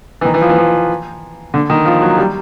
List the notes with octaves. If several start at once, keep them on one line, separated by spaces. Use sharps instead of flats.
E3
D#3
E3
F3
E3
F3
D3
D#3
F3
F#3
G3